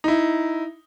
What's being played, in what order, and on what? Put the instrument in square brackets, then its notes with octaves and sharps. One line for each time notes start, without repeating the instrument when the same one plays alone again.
[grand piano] D#4 E4